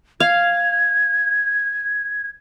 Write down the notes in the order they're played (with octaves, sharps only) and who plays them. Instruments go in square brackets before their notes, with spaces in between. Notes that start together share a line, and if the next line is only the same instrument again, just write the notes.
[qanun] F5 [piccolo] G#6